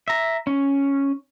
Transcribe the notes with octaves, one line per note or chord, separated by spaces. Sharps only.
E5 A#5
C#4